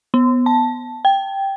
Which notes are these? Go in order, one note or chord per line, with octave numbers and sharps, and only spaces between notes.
B3
A5
G5